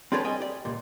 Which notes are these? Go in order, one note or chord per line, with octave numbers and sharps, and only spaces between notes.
C4 D4 G#4 A4 B4 C#5
C2 G3 D#5 G5 G#5
G4 D5
C#2 A#2